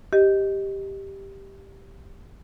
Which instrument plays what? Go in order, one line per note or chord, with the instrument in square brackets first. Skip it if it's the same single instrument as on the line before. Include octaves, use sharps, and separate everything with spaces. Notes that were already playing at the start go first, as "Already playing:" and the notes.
[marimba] G4 D#5